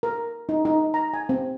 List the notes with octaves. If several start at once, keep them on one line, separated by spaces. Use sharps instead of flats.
A#4
D#4
D#4
A#5
G#5
C4